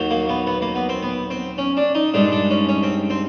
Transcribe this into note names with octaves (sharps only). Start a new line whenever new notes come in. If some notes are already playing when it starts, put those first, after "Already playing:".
Already playing: D#2 D#3 F#3
A#3
B3
B3
A#3
B3
C4
B3
C4
C#4
D4
D#4
G2 D#3 G#3 D4
D4
C#4
C#4
C4
C4